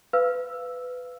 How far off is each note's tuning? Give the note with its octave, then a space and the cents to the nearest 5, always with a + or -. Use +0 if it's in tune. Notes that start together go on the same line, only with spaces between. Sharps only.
B4 +15 F5 -20 E6 +0